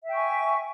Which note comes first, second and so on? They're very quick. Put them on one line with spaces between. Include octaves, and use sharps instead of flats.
E5 G5 C#6 G#5